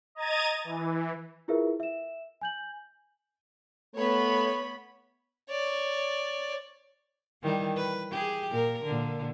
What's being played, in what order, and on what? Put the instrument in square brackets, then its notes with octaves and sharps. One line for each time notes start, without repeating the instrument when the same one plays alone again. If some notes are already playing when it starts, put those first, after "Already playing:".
[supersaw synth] D#5 A#5 G#6 A6 D#7
E3
[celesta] E4 F4 G#4 A#4 B4 E5
E5 E7
G#5 G6 F#7
[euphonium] A3 [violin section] B3 C#5 B5
[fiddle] C#5 D5
[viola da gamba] D#3 E3 G3
B4
G4 G#4
A#2 A#4
A#2 D3